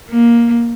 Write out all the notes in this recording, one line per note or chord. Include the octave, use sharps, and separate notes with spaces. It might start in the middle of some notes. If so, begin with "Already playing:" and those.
A#3